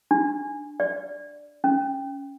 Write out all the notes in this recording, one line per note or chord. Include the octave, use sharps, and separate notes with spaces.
D4
D5
C#4